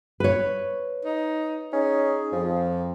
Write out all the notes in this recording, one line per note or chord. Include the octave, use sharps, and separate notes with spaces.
B4 C#5
D#4
C#4 D#4 G#4
F2 F3